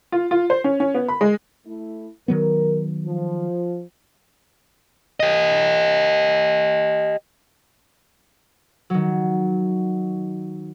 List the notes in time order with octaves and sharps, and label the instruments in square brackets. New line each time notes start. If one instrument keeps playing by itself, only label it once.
[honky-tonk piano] F4
F4
C5
C#4
C#4
B3
B5
G#3
[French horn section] A3 E4
[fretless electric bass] D#3 F#3 B3 [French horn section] A#4
[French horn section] F3
[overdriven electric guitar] G4 D#5
[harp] D#3 F#3